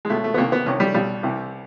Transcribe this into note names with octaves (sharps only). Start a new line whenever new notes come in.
G#3
C#2 B2 A3
A3
B3
C2 C3 D#3 A#3
B3
C2 C3 D#3 C#4
G3
B1 B2 G3
C2 C3 E3